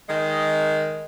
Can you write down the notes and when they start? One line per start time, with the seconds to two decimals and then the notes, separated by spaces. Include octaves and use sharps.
0.08 D#3 G#3